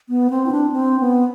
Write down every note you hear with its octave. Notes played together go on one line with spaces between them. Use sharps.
B3
C4
E4
D4
C4
B3